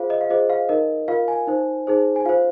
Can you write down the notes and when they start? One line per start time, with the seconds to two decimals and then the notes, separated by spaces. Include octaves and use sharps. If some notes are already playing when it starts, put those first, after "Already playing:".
Already playing: F4 G#4 C5 F5
0.10 D#5
0.21 F5
0.30 F4 G#4 C5 D#5
0.50 F5
0.69 D#4 A#4 D#5
1.08 F4 A#4 F5
1.28 G#5
1.47 D#4 C5
1.87 D#4 G#4 C5
2.16 G#5
2.25 F4 C5 F5